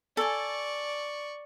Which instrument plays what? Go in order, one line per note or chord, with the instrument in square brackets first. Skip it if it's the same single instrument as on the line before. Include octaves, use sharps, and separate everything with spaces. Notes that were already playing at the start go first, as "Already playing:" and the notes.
[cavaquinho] A4 G#5 [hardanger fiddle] D5 C#6